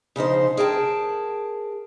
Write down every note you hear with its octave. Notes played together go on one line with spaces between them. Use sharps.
C#3 F3 D#4 C5
G#4 A#4 G5 A5